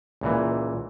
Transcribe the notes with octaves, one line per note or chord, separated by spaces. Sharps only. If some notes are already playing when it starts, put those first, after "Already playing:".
C#2 A#2 E3